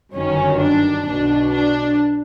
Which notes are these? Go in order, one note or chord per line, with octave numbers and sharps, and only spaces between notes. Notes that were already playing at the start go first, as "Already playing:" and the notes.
G1 F#2 D#3 C#4
D4
B1 B2 D4
D4